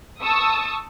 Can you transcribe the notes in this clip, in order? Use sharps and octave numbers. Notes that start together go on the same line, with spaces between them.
A5 C#6 D#6 E6